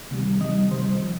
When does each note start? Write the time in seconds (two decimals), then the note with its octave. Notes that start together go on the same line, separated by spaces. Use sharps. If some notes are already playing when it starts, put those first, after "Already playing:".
0.11 C3 D#3 G3
0.41 C3 D#3 G3 D#5
0.71 C3 D#3 G3 C5
1.02 F3